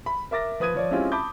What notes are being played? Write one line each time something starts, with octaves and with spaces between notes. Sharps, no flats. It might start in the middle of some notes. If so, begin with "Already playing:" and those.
B5
A#4 E5 D6 A6 A#6
F3 B4 D#6 G#6 D#7
F3 C#5 D5
G#3 C4 C#4 E4 F4 G4
A5 B5 D6 G6